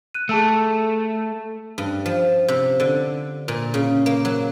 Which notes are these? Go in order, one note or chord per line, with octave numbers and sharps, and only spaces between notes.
F#6 D#7
A3 G#4 A5 E6
G2
F3
C3
D3
A#2
C#3
A#3
F#3